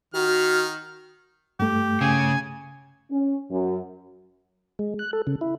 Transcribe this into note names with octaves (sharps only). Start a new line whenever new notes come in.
D#3 F#4 F6
G2 A3 G4
C#3 G#5
C#4
F#2
G#3
F#6
A4
C#3
E4